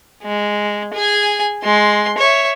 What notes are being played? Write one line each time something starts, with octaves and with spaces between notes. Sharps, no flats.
G#3
G#4 G#5
G#3 C6
C#5 E5